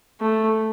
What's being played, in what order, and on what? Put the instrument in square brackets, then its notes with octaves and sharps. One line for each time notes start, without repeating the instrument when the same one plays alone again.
[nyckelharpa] A3